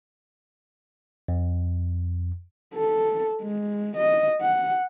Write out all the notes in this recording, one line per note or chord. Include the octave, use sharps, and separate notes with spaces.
F2
A4
G#3
D#5
F#5